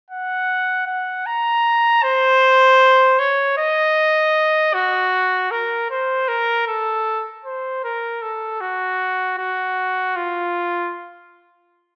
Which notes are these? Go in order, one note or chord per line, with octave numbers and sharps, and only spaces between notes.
F#5
F#5
A#5
C5
C#5
D#5
F#4
A#4
C5
A#4
A4
C5
A#4
A4
F#4
F#4
F4